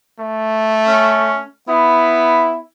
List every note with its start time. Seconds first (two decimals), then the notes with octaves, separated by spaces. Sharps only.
0.19 A3
0.87 C#4
1.68 B3 E4